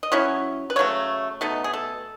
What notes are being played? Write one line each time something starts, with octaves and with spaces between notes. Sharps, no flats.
D#5
F#3 C#4 E4 C#5
B4
C#3 F#3 A3 C#5
B2 A3 D#4
G#4
A4